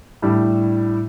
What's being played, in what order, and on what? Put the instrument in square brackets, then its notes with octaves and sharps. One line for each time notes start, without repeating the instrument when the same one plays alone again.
[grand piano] A2 G3 D4